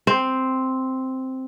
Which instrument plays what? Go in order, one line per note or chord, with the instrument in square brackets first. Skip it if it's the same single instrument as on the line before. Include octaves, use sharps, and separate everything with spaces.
[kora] C4